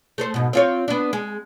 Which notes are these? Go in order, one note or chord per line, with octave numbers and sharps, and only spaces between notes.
A3 A4 C5
G#2 B2
C4 F4 C#5
B3 D4
G#3